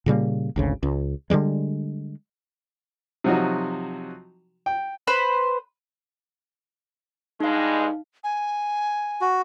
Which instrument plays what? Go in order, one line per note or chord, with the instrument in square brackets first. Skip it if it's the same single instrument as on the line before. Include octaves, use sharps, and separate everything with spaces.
[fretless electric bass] A#2 C#3 G3 A#3
G#1 D2 C#3
C#2
D3 D#3 G3 G#3
[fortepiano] C3 F3 F#3 D#4 F#4
G5
[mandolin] B4 C5 B5
[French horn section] G2 G#3 [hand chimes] D#4 F5
[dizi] G#5
[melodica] F#4